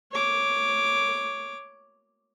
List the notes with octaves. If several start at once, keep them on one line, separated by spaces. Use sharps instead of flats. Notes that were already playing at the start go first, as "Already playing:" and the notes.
C#5 D6